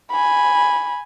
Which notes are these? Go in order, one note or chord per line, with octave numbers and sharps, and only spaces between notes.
G#5 B5